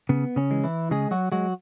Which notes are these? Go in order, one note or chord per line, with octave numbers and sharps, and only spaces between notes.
C#3 B3
C#3 C#4
E3 G#3
E3 E4
C#3 G#3 G#4
F#3 F#4
F#3 G#3 F#4